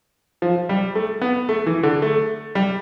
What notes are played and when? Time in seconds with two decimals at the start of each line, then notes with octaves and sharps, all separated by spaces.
0.42 F3
0.69 G3
0.95 A3
1.22 B3
1.49 A3
1.66 E3
1.83 D3
2.02 A3
2.55 G3